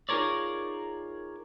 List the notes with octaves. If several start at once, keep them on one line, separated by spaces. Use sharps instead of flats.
D#4 F4 G#4 A#4 C#5 D5